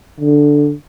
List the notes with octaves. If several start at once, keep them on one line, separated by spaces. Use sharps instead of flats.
D3